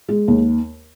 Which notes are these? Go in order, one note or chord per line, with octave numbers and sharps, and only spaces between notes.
G#3
D#2